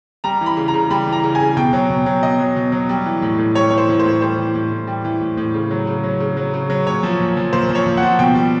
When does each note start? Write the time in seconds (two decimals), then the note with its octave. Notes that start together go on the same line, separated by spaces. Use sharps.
0.24 G3 A#5
0.41 E3 B5
0.57 C#3
0.68 A#5
0.74 C#3
0.90 G3 B5
1.07 E3
1.13 A#5
1.24 C#3
1.35 G#5
1.40 C#3
1.57 B2 G5
1.73 F#3
1.90 B2
2.06 F#3
2.23 B2 D#5
2.39 F#3
2.56 B2
2.72 F#3
2.89 G3
3.06 E3
3.22 A2
3.38 A2
3.55 G3 C#5
3.70 E3 C#5
3.78 C5
3.89 A2
4.00 C5
4.05 A2
4.22 G3 C5
4.38 E3
4.55 A2
4.71 A2
4.87 G3
5.05 E3
5.21 A2
5.37 A2
5.54 C#3
5.71 F#3
5.87 C#3
6.04 F#3
6.20 C#3
6.37 F#3
6.54 C#3
6.70 F#3
6.86 A#2 C#5
7.03 F3
7.20 A#2
7.37 F3
7.53 A#2 C5
7.69 F3
7.75 C#5
7.86 A#2
7.97 F3 F#5
8.19 B2 G5
8.35 G3